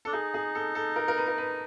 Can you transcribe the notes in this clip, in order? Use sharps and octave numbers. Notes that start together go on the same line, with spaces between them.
D4 A4
D#4 G#4
G#4
A4
A4
A#4
A#4
B4
A#4
B4